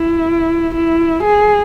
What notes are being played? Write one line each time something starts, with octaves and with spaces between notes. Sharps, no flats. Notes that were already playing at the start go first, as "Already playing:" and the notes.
Already playing: E4
E4
G#4